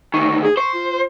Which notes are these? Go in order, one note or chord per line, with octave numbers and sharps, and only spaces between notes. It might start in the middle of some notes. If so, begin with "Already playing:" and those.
D2 D#3 C#6
G#4
C5 C#6
F4